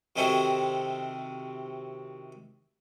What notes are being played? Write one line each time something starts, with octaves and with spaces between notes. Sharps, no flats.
C3 D#3 C4 E4 F#4 A4